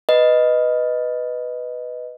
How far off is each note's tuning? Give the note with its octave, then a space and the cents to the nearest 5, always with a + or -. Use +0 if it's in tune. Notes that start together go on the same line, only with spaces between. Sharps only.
B4 +0 D#5 +0